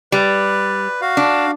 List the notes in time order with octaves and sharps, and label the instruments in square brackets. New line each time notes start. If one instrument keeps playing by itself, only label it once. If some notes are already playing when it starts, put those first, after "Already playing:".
[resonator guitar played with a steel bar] G3 [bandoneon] B4
[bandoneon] F#4 F5
[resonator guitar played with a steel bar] D4